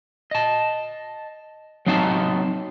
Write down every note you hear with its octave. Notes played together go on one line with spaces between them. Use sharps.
D#5 A5
F#3 C4 D#4 F5 G5 A5